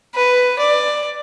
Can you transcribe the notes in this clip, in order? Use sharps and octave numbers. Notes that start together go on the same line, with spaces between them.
B4
D5